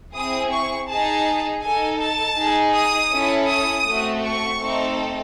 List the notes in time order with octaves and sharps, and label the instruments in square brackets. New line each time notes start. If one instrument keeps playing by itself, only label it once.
[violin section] C4 E4 G#4 D#6
C#6
D#4 G#4 A5
D#4 A4 G#5
A5
D#4 G#4
D#6
C#4 E4 A4
D#6
A3 C4 F#4
C#6
A3 C4 D#4 A4